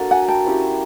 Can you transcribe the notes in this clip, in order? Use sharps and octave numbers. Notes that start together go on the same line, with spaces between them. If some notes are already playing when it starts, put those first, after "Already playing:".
Already playing: A#3 D4 F#4 A4
F#5 G#5
G5 A5
C#4 E4 G4